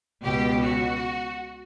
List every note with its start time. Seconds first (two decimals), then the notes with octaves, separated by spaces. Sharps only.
0.24 C#2 B2 G4
0.63 F#4